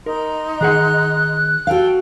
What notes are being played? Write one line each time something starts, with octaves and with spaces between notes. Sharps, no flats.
D#4 A#4 A#5 C6
D#3 G#4 F#5 F#6
F#4 A4 F5 G5